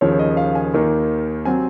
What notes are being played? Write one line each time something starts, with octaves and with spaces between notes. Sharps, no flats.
D#2 C#3 F3 C#5
D#5
F5
G#5
D#2 D#3 A#3
C3 F#3 C4 G#5